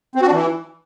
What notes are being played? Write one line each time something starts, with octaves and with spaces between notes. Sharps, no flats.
C4
F#4
D4
E3